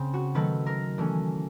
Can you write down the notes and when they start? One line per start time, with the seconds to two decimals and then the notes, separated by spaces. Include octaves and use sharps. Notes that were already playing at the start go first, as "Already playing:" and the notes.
Already playing: C#3 C4
0.14 F#4
0.35 D#3 F#3 A3 B4
0.66 A#4
0.98 E3 A3 C#4